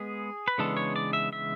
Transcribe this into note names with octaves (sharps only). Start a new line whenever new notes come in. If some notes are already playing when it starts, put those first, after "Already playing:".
Already playing: G#3 B3 G#4
B4
C#3 E3 G#3 B3 D4 A4
C#5
D5
E5
E5